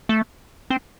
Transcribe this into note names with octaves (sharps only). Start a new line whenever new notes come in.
A3
C4